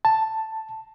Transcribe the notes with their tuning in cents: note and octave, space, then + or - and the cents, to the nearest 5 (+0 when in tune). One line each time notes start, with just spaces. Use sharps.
A5 +5